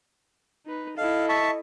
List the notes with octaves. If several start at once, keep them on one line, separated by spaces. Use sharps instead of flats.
D#4 B4
E4 A4 D#5 F5
E5 A5 C#6